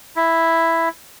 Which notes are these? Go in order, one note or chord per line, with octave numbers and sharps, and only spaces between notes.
E4